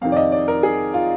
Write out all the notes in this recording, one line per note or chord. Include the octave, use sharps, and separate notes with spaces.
F2 C3 D#3 F5
D5
D#5
D5
A#4
G#4
F4